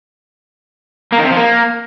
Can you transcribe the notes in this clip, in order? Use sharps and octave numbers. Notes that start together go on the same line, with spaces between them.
A#3
D#3
C3
F3
A#3